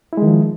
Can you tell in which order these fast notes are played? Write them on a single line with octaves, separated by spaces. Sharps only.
E4 G#3 D#3 F3